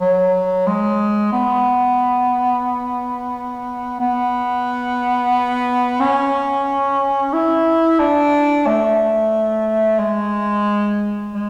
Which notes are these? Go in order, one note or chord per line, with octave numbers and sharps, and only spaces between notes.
F#3
G#3
B3
B3
C#4
E4
D4
A3
G#3
G#3